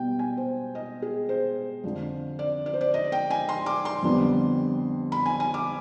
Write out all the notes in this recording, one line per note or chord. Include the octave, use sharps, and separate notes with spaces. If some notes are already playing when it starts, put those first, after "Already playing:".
Already playing: B2 G3 B3 G5
G#5
C5
D#5
G#4
C5
F2 D3 F3
D5
D5
C5
D5
D#5
G5
G#5
C6
D6
C6
F2 D3 G3 B3
B5
G#5
G#5
D6